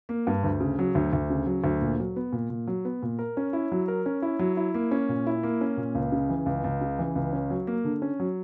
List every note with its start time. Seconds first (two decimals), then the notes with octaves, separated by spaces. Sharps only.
0.09 A#3
0.27 G2
0.44 D2
0.60 C#3
0.79 F#3
0.95 D2
1.13 D2
1.30 C#3
1.46 F#3
1.64 D2
1.82 A#2
1.99 F#3
2.16 B3
2.33 A#2
2.50 A#2
2.67 F#3
2.85 B3
3.03 A#2
3.19 A#4
3.37 C#4
3.53 E4
3.72 F#3
3.88 A#4
4.06 C#4
4.22 E4
4.39 F#3
4.57 E4
4.74 A#3
4.91 C#4
5.09 A#2
5.27 E4
5.43 A#3
5.61 C#4
5.77 A#2
5.95 C#2
6.12 C#3
6.29 E3
6.46 C#2
6.64 C#2
6.81 C#3
6.99 E3
7.15 C#2
7.33 C#4
7.50 F#3
7.67 A#3
7.84 D3
8.02 C#4
8.20 F#3